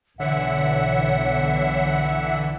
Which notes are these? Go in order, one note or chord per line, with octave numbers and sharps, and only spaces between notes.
B1 D3 E3 C#5 E5 F#5